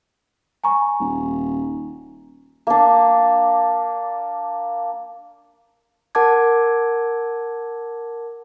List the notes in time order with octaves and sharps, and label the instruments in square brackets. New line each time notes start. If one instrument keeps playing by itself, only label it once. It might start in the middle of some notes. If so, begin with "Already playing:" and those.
[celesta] G#5 A#5 C#6
[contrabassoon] D#1
[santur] A#3 D4
[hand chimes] A#4 F#5 A5 D6 G#6